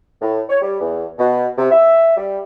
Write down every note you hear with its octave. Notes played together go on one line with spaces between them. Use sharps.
A2
C#5
G3
E2
B2
C3
E5
G3